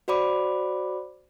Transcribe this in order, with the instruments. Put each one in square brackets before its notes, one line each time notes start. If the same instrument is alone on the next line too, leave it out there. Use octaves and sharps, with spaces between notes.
[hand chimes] F#4 C5 D5 B5 D6